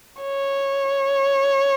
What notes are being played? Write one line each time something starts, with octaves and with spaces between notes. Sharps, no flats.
C#5